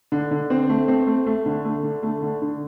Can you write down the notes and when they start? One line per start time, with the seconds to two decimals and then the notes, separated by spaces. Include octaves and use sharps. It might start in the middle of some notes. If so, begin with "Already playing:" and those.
0.12 D3
0.31 D3
0.50 C4
0.69 A3
0.88 C4
1.07 A3
1.26 A3
1.46 D3
1.65 A3
1.83 D3
2.03 A3
2.22 D3
2.42 D3